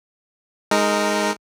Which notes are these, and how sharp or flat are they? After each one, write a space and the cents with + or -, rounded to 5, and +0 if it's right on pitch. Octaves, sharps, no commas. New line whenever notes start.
G#3 +0 D#4 +0 A#4 -15